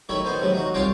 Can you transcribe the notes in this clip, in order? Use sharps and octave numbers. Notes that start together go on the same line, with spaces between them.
D#3 F#3 A3 E4 C#5 E5
B3 D#4 C5
A2 C3 F#3 A3
D#4 F#4
C2 F4 C#5 G5 A5 C6